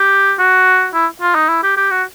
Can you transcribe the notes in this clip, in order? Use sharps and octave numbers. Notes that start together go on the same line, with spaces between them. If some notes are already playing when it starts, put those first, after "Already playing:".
Already playing: G4
F#4
E4
F4
D#4
E4
G4
G4
F#4